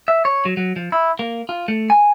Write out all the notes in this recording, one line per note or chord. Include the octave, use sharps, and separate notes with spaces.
E5
C#5
F#3
F#3
F3
E4
A#3
F4
A3
G#5